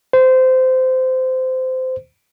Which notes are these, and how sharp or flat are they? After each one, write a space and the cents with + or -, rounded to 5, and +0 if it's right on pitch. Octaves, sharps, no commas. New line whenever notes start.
C5 -20